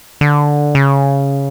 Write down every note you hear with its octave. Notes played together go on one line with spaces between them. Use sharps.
D3
C#3